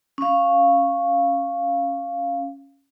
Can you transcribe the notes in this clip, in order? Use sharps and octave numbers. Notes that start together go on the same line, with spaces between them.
C#4 F5